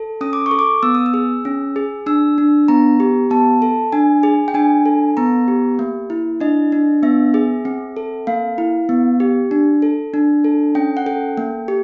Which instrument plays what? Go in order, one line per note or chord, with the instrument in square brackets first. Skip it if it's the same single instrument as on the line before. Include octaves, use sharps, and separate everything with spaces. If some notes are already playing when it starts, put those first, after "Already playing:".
Already playing: [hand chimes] A4
C#4 D#6
D6
C#6
A4
D6
B3 E6
D#6
E6
G#4
C#4
G#4
D4 E6
D4
B3 A#5
G4
B3 A5
A4
D4 G#5
G#4
G5
D4 G#5
A4
B3 A#5
G4
A#3
E4
D4 D#5
D4
B3 E5
G#4
C4
A4
A#3 F5
E4
B3
G4
D4
A4
D4
A4
C#4 G5
F#5
A4 G5
A#3
G4